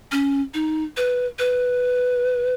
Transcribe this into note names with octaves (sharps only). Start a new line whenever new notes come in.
C#4
D#4
B4
B4